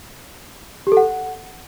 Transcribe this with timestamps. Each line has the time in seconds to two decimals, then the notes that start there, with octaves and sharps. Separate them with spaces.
0.87 G4
0.92 A4
0.97 F#5